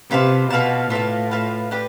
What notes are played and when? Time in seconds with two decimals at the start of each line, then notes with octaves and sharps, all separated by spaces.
0.10 C3 F4 B4 F5 A5
0.50 B2 F4 B4 F5 A5
0.90 A2 F4 B4 F5 A5
1.31 F4 B4 F5 A5
1.71 D4 G4 B4